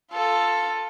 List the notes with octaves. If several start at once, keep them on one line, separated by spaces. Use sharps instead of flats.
F4 A4